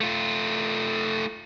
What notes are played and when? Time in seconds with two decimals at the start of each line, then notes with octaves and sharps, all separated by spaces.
0.01 A3 F4